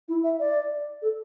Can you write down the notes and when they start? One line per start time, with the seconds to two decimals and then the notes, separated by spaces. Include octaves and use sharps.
0.08 E4
0.24 E5
0.40 D5
1.02 A4